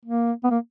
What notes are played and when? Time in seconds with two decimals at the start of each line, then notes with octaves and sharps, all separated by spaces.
0.05 A#3
0.44 B3
0.51 A#3